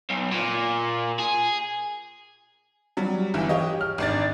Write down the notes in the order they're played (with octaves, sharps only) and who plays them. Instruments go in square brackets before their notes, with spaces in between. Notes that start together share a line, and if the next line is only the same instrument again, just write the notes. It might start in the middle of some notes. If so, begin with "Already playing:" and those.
[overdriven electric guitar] B1
A#2
G#4
[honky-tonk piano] F#3 G3
G1 E3 E4
G4 C#5 D#5
F6
G#1 D4 A6